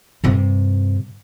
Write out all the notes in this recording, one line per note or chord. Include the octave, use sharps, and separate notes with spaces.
G2 C3